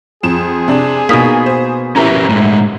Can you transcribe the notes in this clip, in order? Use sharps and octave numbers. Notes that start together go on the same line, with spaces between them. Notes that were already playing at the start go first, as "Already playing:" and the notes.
F2 G#4 E7
C3 D4
B2 A#3 D#4 D#6 B6
C5
C#4 E4 G4 A#4 B4 A#5
A2 G#3